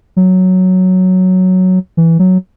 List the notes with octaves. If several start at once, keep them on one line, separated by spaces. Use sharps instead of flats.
F#3
E3
F#3